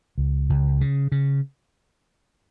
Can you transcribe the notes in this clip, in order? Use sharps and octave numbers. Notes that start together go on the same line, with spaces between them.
C#2
C#2
C#3
C#3